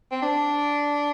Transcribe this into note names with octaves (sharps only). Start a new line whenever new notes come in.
C4
D4